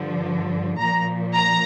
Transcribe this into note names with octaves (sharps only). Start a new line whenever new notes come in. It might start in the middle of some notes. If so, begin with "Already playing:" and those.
Already playing: G2 D3 F3
A#2 F3 A#5
A#5